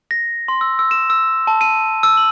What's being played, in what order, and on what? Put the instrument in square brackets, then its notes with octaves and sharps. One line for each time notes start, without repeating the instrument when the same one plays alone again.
[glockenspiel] A#6
C6
E6
E6
E7
E6
A5
D#7
E6
F#7